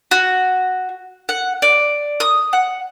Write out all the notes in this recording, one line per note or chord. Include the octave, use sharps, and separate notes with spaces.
F#4
F#5
D5
D#6
F#5